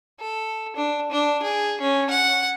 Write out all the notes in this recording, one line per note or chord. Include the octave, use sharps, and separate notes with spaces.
A4
D4
D4
G#4
C#4
F#5